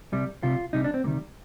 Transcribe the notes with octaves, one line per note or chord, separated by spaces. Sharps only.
C2 C3 G3
C2 C3 G3 F4
C2 C3 G3 D#4
D4
C4
D2 C3 D#3 G3 A#3